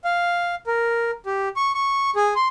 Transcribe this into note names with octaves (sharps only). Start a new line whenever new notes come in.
F5
A#4
G4
C#6
C#6
G#4
C6